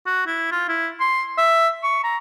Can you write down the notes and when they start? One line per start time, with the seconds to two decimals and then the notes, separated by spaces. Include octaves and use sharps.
0.06 F#4
0.26 E4
0.52 F4
0.68 E4
1.00 C6
1.38 E5
1.83 C#6
2.04 A#5